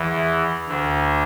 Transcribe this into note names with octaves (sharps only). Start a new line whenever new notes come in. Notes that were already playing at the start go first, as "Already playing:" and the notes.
Already playing: E2 E3
D2 D3